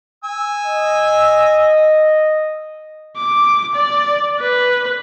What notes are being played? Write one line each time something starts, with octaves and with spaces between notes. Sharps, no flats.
G#5 E6
D#5
D6
D5
B4